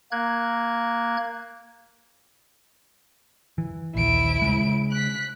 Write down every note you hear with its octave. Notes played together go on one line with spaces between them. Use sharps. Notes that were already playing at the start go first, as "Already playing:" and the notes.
A#3 F#6 G#6
E3
A#1 D#2 E4 D7
C#3 G#3
F#6 B6